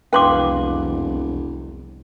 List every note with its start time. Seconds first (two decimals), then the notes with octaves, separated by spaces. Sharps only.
0.13 E1 C2 F2 B4 F5 G5 C6 D6